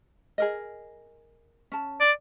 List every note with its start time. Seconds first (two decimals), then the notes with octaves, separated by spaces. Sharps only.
0.38 G#4 A#4 D#5
1.72 C#4 A5
2.01 D5